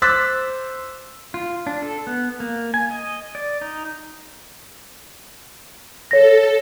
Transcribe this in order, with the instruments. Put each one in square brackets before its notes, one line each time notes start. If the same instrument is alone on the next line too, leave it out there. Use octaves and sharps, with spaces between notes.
[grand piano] C5 D6 E6 F#6 A6 B6
[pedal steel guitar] F4
D4
A4
B3
A#3
G#5
D#5
D5
D#4
[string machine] A4 [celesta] C#5 A#6